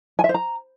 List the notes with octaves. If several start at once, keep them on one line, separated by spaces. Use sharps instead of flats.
G#5
E5
C5
A#5